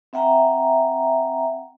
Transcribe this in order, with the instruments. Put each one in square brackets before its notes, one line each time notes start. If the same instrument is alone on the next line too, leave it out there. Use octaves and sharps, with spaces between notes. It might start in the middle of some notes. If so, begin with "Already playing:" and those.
[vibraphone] C4 E5 F#5 G5 A#5